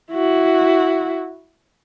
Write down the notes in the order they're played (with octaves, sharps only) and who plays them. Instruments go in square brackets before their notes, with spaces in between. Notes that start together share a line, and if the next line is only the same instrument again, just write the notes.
[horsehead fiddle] E4 F#4